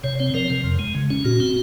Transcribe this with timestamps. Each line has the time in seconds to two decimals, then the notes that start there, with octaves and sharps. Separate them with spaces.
0.04 C3 C#5
0.19 C4 C#5
0.34 F3 A#4
0.50 C3
0.64 F2
0.79 G#3
0.95 C#3
1.10 C#4
1.24 A#2 F#4
1.40 C4